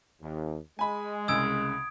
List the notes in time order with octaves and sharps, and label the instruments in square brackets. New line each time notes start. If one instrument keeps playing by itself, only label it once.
[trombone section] D#2
[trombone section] G#3 [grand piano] G#5 B5
[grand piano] C2 C#3 E6 [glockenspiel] D#6 G#6 D7